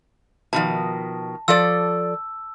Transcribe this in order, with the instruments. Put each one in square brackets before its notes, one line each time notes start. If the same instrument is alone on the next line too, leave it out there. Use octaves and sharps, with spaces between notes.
[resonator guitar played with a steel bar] B2 D#3 F3 [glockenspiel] A5
[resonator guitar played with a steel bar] F3 A4 D5 [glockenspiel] E6